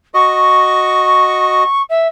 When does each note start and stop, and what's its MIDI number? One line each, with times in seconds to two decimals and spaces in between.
0.14 1.64 66
0.14 1.64 75
0.14 1.82 85
1.89 2.07 76